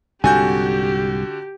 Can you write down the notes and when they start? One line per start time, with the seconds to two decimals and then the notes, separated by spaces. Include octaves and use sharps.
0.24 C2 G#2 D3 F#4 G4 G#5 G6